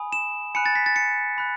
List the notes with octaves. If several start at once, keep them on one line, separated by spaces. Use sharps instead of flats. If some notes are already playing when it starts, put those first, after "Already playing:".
Already playing: G#5 B5 D#6
E7
G#5 B5 F#6 C#7
A6
B6
A6
C#7
B5 F#6